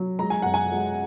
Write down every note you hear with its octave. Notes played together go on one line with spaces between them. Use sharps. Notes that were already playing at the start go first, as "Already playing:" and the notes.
Already playing: F#3
G#3 A#5
G#5
F#2 F#5
G#5
G#3